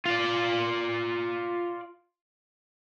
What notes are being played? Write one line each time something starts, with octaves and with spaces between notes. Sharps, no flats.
F4 D5